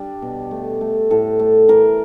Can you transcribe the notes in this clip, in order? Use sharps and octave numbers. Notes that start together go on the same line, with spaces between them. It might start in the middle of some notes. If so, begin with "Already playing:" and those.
Already playing: G3 D4
B2
A3
A3
A2 A4
A3
E3 A#4